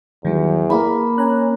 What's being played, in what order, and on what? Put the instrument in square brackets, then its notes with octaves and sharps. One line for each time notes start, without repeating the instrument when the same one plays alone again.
[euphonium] E2 [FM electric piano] D#3 F#3 G3
[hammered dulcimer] A#3 B5 [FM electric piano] E4 G#4 A#4
[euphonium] C#4 [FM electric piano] G#5 A#5 F#6